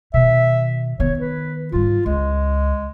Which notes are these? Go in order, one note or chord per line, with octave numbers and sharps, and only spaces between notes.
B2 D#3 E5
D#3 B3 C#5
B4
G#2 G3 F4
C#2 G#3